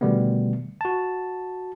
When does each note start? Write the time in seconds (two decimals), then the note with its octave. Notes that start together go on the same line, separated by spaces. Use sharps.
0.01 B2 D3 D#3 G3 A3 B3
0.81 F#4 A5